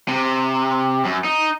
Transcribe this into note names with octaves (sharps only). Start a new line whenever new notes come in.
C3
F#2
D#4